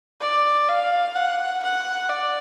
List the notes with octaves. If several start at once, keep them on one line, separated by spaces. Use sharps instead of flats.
D5
F5
F#5
F#5
D5